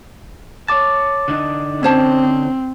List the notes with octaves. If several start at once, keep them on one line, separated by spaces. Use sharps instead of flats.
C#5 A5 D6 A6
D3 D4 D#4
C4 C#4 C5 A5